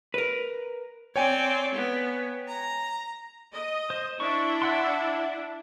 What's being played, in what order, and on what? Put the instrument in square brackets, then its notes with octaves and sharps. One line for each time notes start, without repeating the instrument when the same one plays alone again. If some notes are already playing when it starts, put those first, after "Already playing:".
[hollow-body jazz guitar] A#4 B4
[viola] C4 D5 [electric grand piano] C#5 G5 G#5
[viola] B3
A#5
[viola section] D#5
[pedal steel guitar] C5
[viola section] D4 E4 [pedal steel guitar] C#6
[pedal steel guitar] E5 F#5 C6